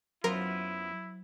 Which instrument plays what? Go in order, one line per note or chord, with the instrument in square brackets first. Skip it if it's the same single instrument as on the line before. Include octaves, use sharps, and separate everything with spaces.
[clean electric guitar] F#2 B3 F4 [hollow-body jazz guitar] F#3 C5 C6 [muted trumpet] E4 [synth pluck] A#4